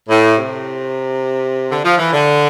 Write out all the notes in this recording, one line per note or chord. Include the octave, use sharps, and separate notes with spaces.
A2
C3
D3
F3
E3
D3